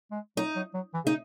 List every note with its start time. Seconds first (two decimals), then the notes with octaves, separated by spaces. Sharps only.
0.11 G#3
0.37 F#3 D#4
0.56 F#3
0.74 F#3
0.94 E3
1.05 C#3 D#4